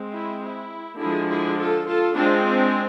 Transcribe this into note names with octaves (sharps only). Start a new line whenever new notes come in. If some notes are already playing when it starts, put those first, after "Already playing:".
Already playing: G#3 C4
E4
E4
D3 F3 G#3 E4 G#4
E4 G#4
F4 A4
F4 A4
G#3 C4 D4 F4
D4